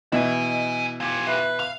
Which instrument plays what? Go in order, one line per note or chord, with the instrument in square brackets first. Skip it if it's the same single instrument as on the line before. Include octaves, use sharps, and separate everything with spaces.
[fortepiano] B2 E3 [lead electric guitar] E4 G#5 [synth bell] D#5
[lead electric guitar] F4 G4 [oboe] G#5
[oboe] B4 [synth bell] E5
[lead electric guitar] F5 [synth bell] F7